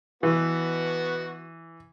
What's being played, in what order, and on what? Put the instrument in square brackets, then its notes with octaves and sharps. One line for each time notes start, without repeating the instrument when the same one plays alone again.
[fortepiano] E3 [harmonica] B3 F#4